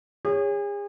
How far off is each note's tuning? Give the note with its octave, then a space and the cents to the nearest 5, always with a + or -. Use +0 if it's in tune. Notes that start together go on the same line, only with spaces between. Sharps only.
G#4 -40 C#5 +0